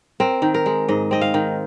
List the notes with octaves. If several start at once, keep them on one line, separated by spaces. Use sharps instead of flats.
C4 A#4
D#3
A#4
G#3
G#2 D#5
C4 D#5
F5
D#3